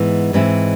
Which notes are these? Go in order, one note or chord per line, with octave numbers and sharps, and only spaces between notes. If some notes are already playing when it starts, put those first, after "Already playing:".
Already playing: G#2 E3 G#3 B3
G#2 E3 G#3 C4 E4